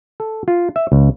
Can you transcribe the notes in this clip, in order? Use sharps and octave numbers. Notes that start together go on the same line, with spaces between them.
A4
F4
E5
C#2